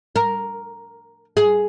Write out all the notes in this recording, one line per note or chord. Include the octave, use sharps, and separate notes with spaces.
A#4
G#4